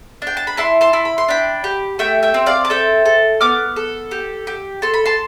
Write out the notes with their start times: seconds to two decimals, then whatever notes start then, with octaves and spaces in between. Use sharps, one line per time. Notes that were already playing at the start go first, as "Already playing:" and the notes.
0.22 D4 G5
0.37 A5
0.47 B5
0.57 E4 A5 C6
0.81 A5 C6
0.93 E4
1.05 B5
1.18 C6
1.29 D4 G5 B5
1.64 G4
1.99 A3 E5 G5
2.23 E5 G5
2.34 C4
2.46 D5 F5
2.65 A5
2.70 A4 E5 G5
3.05 A4
3.41 B3 D6 F6
3.76 A4
4.11 G4
4.47 G4
4.82 A4 C6
4.94 B5
5.05 A5 C6